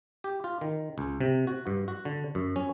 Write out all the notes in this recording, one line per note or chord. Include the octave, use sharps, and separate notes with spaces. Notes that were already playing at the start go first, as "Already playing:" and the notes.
G4
F4
D#3
C#2
C3
F#4
G2
F#4
D3
F#2
C#4